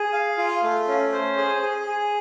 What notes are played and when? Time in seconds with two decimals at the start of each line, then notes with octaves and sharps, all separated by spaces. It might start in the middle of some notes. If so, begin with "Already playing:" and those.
Already playing: G#4
0.13 F5
0.38 F4
0.63 A3
0.88 C#4
1.13 C5
1.37 G#4
1.62 G#4
1.87 G#4